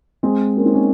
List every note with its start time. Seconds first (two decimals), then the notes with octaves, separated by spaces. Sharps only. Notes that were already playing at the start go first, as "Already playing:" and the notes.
0.23 G#3 C4
0.57 A#3 C#4
0.65 C4 D#4
0.74 A#3 C#4